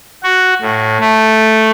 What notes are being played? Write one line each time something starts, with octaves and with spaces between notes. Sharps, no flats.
F#4
A2
A3